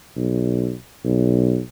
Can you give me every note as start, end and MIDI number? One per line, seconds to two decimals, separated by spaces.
0.16 0.74 35
1.05 1.60 35